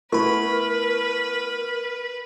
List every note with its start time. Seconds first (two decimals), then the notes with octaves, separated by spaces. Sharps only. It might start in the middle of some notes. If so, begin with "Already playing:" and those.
0.12 A3 B3 E4 A#4 B4 B5 C#6